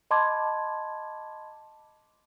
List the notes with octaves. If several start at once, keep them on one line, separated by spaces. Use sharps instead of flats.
D#5 A5 B5 C6 D6 G#6